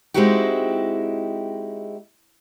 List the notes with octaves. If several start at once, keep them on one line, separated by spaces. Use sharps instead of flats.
G#3 C4 D#4 E4 F#4 G4